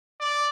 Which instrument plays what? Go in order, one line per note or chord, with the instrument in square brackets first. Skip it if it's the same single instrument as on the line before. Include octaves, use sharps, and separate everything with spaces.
[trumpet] D5